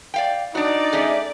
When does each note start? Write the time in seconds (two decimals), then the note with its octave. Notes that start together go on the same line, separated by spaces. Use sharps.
0.14 D5 F5 G5
0.55 D4 D#4 F#4 D5
0.93 A3 C#4 G#4